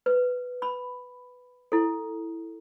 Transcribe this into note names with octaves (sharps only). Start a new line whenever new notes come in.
B4
B5
E4 A4